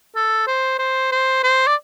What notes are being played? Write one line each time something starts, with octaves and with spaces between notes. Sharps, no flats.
A4
C5
C5
C5
C5
D5